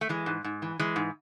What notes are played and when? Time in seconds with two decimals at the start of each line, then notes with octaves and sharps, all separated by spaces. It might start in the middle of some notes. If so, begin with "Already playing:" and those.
0.01 A3
0.09 E3 G#3
0.26 G#2
0.44 G#2
0.62 E3
0.79 E3 G#3
0.96 G#2